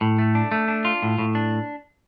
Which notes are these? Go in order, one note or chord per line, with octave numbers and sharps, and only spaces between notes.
A2
A3
D4
A3
D4
F4
A2
A2
D4